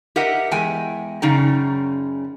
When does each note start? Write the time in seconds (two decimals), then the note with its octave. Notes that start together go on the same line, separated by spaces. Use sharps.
0.16 G4 A#4 D#5 E5 F#5
0.51 E2 G#3 G5 G#5
1.22 F#2 C#3 D#4 D5 G5 A#5